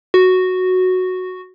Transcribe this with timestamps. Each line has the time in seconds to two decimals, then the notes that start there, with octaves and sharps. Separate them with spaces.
0.14 F#4